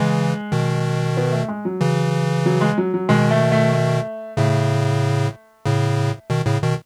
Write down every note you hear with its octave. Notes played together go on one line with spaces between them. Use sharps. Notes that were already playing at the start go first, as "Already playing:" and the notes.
Already playing: C#3 E3 G#3
B2 D#3
B3
A3
G#3
F#3
C#3 E3
F#3
G#3
F#3
F#3
B2 D#3 G#3
A3
A3
A3
A2 C#3 A3
A2 C#3
B2 D#3
A2 C#3
B2 D#3